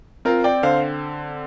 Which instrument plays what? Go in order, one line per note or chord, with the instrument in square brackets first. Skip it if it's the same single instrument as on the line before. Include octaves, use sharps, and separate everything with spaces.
[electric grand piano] C4 [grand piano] F4 A#4
[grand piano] D5 G5
[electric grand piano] D3 [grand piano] C5 F5